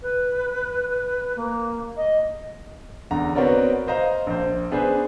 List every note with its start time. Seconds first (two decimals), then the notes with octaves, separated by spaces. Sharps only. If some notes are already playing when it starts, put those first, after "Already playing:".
0.02 B4
1.37 A#3
1.97 D#5
3.11 E2 D3 A#5
3.35 B3 C4 F#4 A#4 C#5 D5
3.88 C5 D#5 F5 A#5
4.27 A#1 C5
4.71 B3 D4 G#4 B4 C5